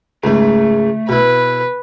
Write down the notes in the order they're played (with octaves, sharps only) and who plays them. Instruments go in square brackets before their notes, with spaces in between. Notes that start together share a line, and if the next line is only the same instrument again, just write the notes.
[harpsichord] C#2 G#2 [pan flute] A3
[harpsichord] B2 E4 [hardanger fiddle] B4